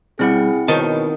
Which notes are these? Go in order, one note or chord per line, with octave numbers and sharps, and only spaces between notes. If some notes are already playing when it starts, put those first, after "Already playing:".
B2 G3 C4 E4 G#4 F#5
B2 D#3 C5 C#5 A5